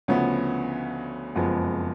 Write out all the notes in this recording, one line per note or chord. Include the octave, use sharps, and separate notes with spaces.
D2 C#3 F3 B3
F#1 F2 F3 G#3 B3